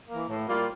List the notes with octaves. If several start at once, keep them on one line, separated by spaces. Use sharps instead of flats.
A#3
E3
A2
G3 A#3 F4